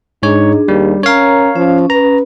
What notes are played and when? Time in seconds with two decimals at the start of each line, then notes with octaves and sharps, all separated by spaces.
0.23 G#2 D4 D#4 G#4 C#5
0.68 D#2 G3
1.03 C#4 A#4 C#5 F5 A#5
1.56 F3 C#4
1.90 B4 A#5